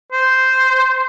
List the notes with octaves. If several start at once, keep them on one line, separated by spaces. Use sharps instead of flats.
C5